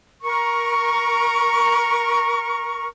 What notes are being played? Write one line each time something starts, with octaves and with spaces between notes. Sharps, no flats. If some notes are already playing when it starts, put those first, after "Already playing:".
A#4 C#6